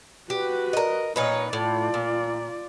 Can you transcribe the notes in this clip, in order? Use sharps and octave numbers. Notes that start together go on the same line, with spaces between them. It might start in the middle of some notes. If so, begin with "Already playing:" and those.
F#4 G4 B4
A#4 D#5
A#2 D#4 B4 C#5
A2 F4 D5
A#2